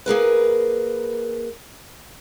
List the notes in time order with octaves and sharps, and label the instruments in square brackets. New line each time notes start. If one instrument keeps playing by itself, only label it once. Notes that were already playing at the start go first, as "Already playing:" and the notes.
[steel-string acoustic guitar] A#3 G#4 A#4 B4